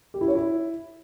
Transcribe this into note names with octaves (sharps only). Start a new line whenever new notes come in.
G4
E4
C#5
E4